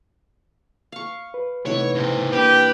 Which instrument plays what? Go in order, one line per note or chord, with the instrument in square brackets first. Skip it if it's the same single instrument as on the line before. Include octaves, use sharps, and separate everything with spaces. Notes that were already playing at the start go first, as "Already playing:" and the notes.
[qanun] F5 C#6
[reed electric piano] B4
[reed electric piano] C3 A3 D#4 [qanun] E3 B3 E5 [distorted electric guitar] C#5
[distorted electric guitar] C#3 C5
[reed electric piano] C2 A#3 D4 [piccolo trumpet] G4 [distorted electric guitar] B4